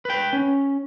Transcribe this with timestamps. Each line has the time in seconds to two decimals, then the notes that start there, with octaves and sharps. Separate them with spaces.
0.05 B4 G5
0.33 C#4